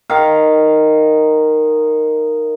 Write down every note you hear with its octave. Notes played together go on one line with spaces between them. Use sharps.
D#3 F5